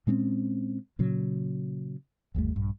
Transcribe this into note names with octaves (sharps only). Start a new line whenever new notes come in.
A#2 G#3 C4 C#4
A#2 C#3 F#3
G1 D#2 G3 A3
A#1 G2